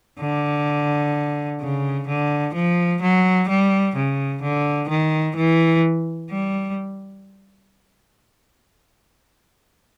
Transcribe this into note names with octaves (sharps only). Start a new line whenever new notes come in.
D3
C#3
D3
F3
F#3
G3
C#3
D3
D#3
E3
G3